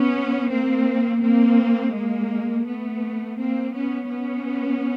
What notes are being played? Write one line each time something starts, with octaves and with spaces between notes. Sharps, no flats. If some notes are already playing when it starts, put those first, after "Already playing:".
Already playing: B3 C#4
A#3 C4
A#3 C4
G#3 A#3
A3 B3
A#3 C4
B3 C#4
B3 C#4